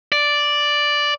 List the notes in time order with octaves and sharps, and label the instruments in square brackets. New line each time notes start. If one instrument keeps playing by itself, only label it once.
[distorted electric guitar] D5